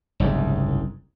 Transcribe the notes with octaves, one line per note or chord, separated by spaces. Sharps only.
F#1 C2 G#2